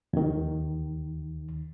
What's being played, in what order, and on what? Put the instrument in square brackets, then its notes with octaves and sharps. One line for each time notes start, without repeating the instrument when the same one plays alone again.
[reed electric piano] D#2 D#3